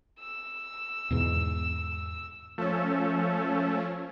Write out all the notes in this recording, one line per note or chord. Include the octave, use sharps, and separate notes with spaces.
E6
E2 G#2 B2
F3 A3 C#4